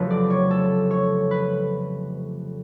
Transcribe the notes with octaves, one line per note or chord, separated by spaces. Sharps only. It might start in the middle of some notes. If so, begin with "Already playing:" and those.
Already playing: F1 F2 C#3 F#3 A3 B4
D5
C#5
A4
C#5
B4